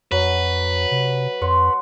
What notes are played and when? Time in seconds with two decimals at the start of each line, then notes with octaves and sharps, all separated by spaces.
0.12 F2 F#3 B4
0.91 C3
1.41 F2 C#5 F#5 C6